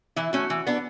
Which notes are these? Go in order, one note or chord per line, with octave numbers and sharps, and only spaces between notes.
E3 E4
A3 C#4 F#4
E3
B3 D4